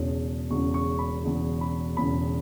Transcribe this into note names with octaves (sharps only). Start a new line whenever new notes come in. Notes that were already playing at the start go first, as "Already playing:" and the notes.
Already playing: E1 E2 C#3 C#5
E1 E2 C#3 C#6
C#6
B5
E1 E2 C#3
B5
E1 E2 C#3 B5